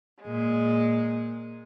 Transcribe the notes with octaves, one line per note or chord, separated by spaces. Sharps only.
A#2 G#3